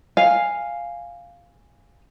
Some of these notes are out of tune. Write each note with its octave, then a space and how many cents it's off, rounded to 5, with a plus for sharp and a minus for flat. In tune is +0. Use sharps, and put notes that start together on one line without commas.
F5 +0 G#5 -10